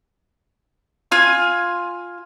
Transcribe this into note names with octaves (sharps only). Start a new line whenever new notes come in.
F4 G#5 F6